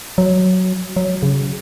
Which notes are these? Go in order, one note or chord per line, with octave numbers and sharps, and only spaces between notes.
F#3
F#3
C#3